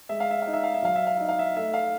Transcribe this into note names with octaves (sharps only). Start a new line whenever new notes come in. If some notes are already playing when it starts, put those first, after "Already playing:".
G#3 E5
F5
E5
D#4 F5
E5
F5
E5
F#3 F5
E5
F5
D#4 E5
F5
E5
A3 E5
F5